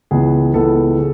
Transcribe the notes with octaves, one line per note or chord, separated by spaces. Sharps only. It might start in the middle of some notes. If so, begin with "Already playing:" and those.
C#2 C#3 E3 B3 G#4
C#2 C#3 E3 B3 A4
C#3